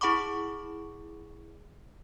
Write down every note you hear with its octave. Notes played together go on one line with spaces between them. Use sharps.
E4 G#4 F#5 B5 C#6 D6